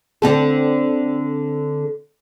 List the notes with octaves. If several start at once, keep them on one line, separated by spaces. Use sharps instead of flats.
D3 C4 A4